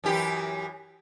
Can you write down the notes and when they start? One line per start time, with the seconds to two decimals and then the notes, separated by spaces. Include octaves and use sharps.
0.04 F#2 E3 G4